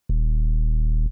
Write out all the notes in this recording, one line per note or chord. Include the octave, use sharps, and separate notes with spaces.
D#1